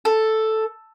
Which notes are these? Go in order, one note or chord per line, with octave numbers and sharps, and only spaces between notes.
A4